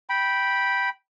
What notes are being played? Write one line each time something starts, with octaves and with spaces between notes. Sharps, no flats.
G5 B5